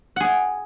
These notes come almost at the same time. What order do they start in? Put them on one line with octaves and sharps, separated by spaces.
F#5 G#4 G#5